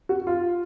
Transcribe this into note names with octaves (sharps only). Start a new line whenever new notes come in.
F#4
F4